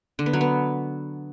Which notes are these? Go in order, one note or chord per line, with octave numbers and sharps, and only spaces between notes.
D3
B3
F#3
B3